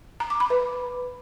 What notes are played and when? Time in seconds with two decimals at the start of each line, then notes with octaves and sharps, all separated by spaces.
0.20 A#5
0.30 D6
0.40 B5
0.50 B4